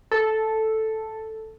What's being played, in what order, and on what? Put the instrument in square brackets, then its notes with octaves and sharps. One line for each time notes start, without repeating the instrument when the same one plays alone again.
[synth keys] A4